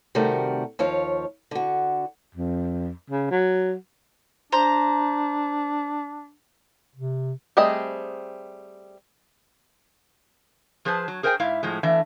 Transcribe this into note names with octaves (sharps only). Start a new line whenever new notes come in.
C3 D#3 G3 A3 F#4 A#4
D#2 F3 C#5 F5
D3 F#4
F2
C#3
F#3
D4 C5 A#5
C3
G3 A3 C4 G#4 D#5
F3 G#4 B4 C5 A5
F#3
G#4 A#4 C5 E5 G5 G#5
G#2 E4 E5 F5
A2 F3 G#3
E3 A3 D4 E5 F5